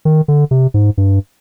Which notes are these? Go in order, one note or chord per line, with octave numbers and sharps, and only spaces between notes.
D#3
D3
C3
G#2
G2